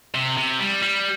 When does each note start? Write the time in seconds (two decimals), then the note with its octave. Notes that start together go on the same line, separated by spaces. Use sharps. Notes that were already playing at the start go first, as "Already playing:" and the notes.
0.15 C3
0.37 C3
0.60 G3
0.83 G3